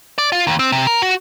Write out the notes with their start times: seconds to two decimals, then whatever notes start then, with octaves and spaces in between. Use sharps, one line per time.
0.18 D5
0.32 F4
0.47 D#2
0.59 C4
0.72 C3
0.87 A#4
1.02 F#4